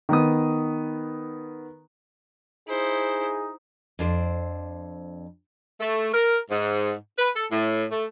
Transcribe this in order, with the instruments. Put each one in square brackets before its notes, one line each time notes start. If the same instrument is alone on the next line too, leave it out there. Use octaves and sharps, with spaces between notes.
[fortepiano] D#3 B3 D#6
[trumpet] D#4 [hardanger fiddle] E4 C5 [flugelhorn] G#4
[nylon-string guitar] F2 D4 C5
[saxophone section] A3
A#4
G#2
B4
A4
A2
A3